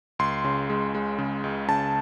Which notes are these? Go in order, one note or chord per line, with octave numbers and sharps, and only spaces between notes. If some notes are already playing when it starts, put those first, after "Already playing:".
C#2 C6
C#3
G#3
G#3
C#3
C#2
C#3 A5